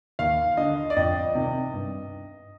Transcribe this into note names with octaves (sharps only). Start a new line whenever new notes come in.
D#2 F5
D3 D#5
D5
F2 D#5
C3 D#3
G2